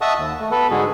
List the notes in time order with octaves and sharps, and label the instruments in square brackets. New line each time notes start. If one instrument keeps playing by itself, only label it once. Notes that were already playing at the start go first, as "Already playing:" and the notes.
[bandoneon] D#5 E5 F#5 A5 C#6 D#6
D#2
A3
B3 A4 B4
G#2 D3 G#3 F#4 G#4